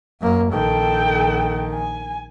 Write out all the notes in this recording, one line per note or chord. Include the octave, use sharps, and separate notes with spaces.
F#2 A#3
A#1 D#3 A4 G5
G#5